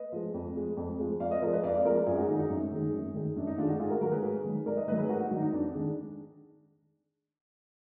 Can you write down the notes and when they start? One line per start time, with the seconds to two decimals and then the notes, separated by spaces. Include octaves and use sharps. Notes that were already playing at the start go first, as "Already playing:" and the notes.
Already playing: B4 D#5
0.12 F3 G#3
0.34 F2
0.55 F3 G#3
0.77 F2
0.98 F3 G#3
1.20 F2 D5 F5
1.31 B4 D#5
1.42 F3 A#4 D5
1.46 G#3
1.53 B4 D#5
1.63 F2 D5 F5
1.74 D5 F5
1.85 F3 A#4 D5
1.88 G#3
1.96 A#4 D5
2.06 F#2 F4 G#4
2.17 D#4 F#4
2.23 G#4
2.28 D#3 G#3 D#4 F#4
2.39 D#4
2.50 F#2
2.72 D#3 G#3
2.93 F#2
3.14 D#3 G#3
3.36 F#2 D4
3.47 D#4
3.58 D#3 D4 F4
3.62 G#3
3.69 D#4 F#4
3.80 G#2 F4 G#4
3.90 F#4 A#4
4.01 D#3 F#3 F#4 A#4
4.12 G#4 B4
4.23 G#2
4.45 D#3 F#3
4.66 G#2 A#4 D5
4.77 B4 D#5
4.88 D#3 B4 D#5
4.92 F#3
4.98 G#4 B4
5.09 G#2 F#4 A#4
5.20 D#4 F#4
5.31 D#3 F#3 D#4
5.42 D#4
5.53 F2 D4
5.74 D#3 G#3 D4